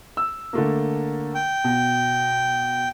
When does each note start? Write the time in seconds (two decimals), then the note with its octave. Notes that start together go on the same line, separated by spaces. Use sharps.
0.17 E6
0.53 D3 A3 A#3
1.35 G5
1.64 B2